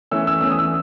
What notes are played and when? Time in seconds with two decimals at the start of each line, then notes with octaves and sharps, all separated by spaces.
0.11 E3 A3 C#4 E6
0.27 E6
0.41 E3 A3 C#4 E6
0.50 D#6
0.59 E6